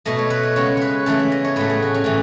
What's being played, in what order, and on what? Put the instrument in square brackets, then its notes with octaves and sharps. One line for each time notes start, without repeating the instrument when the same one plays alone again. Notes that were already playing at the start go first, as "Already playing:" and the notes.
[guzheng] B2 A3 D#5
C#5
B4
C#5
C#3 G#3 B3 C#5
B4 C#5
C#3 E3 A3 A4
E5
D#5
C#5
A2 F#3 A3 B4
G#4
F#4
C#4
A2 E3